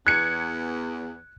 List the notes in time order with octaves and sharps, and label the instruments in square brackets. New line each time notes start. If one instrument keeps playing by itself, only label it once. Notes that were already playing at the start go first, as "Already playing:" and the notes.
[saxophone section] E2 [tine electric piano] F#6 [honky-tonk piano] G#6 C#7